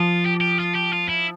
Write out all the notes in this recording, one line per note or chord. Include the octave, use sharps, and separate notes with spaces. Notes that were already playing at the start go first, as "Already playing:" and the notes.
Already playing: F3 F4
G4
G4
F4
G4
F4
E4